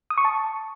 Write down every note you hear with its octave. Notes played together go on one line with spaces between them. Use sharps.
D#6
C#6
A5